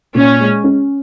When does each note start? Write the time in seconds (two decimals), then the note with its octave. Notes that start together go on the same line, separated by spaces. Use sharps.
0.15 A#2 C#4
0.39 G#3
0.64 C#4